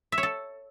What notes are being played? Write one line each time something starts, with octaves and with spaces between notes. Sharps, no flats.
E5
C#5
A4